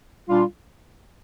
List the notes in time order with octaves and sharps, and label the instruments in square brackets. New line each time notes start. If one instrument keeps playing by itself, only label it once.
[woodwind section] A#2 G3 D4 F4